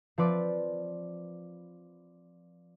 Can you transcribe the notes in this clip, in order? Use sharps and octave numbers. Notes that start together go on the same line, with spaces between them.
F3 C4 B4 D5